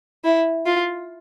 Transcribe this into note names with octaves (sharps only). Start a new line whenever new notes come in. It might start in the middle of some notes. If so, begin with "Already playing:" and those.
E4
F4